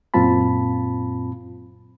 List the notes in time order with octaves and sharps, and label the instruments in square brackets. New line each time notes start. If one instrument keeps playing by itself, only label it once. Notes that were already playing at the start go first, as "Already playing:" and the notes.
[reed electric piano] F#2 A#2 C4 F4 A5 B5